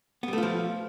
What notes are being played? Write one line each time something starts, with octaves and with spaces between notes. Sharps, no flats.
F3 G3 A3 B3 F4